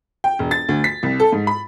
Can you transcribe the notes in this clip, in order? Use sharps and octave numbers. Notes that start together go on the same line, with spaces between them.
G5
E1
A6
D2
B6
C2
A4
G#2
B5